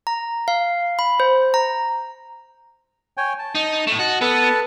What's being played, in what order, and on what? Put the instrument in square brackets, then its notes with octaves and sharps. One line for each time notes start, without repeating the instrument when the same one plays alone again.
[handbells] A#5
F5
B5
C5
A#5
[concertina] C#5 G5 G#5
A5
[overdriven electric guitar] D#4
A2 A3
[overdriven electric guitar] F#4 [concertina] D#5 A5
[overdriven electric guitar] B3 [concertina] A4 B4 A5